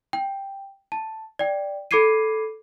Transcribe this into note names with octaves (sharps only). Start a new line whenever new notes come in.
G5
A5
D5 G5
A4 B5 D6 G#6 C7 D#7